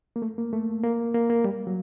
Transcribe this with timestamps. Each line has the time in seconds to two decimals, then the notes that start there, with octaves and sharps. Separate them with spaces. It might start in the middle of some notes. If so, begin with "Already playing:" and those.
0.16 A#3
0.22 A3
0.38 A#3
0.53 A3
0.83 A#3
1.15 A#3
1.30 A#3
1.44 G3
1.67 F#3